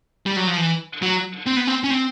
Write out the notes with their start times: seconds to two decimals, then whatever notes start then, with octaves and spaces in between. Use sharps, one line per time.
0.26 G3
0.36 F#3
0.47 F3
0.57 E3
1.02 F#3
1.46 C4
1.57 B3
1.67 C4
1.84 C#4
1.90 C4